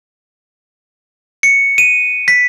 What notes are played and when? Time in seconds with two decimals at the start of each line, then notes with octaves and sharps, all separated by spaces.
1.43 C#7
1.78 D#7
2.28 B6